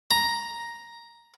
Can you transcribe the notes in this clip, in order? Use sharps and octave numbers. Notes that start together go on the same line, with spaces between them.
A#5